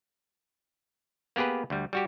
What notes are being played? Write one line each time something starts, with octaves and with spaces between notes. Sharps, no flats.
A#3 B3 G4 G#4 B4
D2 G3
G3 F#4 G4